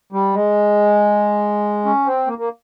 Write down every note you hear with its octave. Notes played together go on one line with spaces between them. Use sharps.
G3
G#3
C#4
C4
A#3
A#3